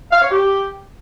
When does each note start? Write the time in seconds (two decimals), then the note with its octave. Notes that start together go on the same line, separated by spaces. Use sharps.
0.11 F5
0.21 C#5
0.31 G4